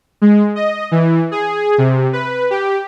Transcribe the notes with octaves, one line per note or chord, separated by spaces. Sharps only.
G#3
D#5
E3
G#4
C3
B4
G4